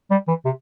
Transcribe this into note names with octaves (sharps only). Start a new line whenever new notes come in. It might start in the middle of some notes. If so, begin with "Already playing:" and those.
G3
E3
C3